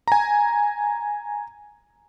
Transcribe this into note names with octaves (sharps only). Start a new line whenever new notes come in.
G#5 A#5